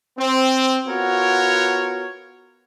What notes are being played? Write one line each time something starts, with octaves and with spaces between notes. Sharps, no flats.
C4
B3 F4 F#4 A#4 C#5